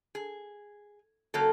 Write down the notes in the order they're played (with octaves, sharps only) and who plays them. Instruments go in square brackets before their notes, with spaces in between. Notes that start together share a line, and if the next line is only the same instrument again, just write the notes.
[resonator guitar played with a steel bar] G#4
C#3 F#3 A#3 A4